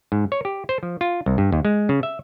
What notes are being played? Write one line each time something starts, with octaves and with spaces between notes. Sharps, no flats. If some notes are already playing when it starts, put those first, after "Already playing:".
G#2
C#5
G4
C5
F3
F4
C2
G2
D#2
G#3
C#3
E5